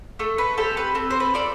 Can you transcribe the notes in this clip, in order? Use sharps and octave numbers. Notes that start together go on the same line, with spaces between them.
A3 A4
B4
C4 G4 A4
B4
C4 A4
C5
B4
F4 A4 D5